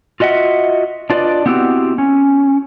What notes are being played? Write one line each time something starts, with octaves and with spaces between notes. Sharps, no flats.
F4 F#4 D#5 E5 F#5
D4 F4 B4 C5 D5 D#5
B3 C4 E4 F#4 G4
C#4